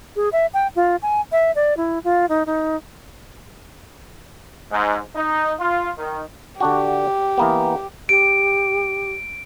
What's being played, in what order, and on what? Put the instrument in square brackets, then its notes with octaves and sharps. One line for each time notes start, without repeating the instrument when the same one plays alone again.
[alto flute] G#4
E5
G5
F4
G#5
E5
D5
E4
F4
D#4
D#4
[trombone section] G#2
D#4
F4
D#3
[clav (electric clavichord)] D3 D4 F#4 [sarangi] G4
[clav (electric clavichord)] E3 A#3 B3
[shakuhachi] G4 [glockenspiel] D7